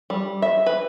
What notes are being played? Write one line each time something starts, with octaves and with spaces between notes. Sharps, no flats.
G3
E5
B4